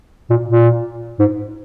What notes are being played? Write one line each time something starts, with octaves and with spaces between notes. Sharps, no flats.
A#2
A#2
G#2